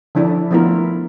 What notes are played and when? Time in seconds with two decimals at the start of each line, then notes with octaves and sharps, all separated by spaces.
0.15 D3 F3 D4 E4 A4
0.51 F3 A3 B3 E4 F4 A#4